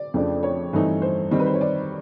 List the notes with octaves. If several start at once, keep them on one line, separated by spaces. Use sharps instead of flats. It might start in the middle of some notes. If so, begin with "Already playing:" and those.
Already playing: D5
F2 C#3 F3 A3 D4
C#5
G2 E3 A3 C4 D#4
C5
D#3 G3 C4 D#4
B4
C5
C#5
D5